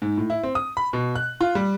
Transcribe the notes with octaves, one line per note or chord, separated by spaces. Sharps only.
G#2
A2
E4
C4
D#6
B5
B2
F#6
F4
G3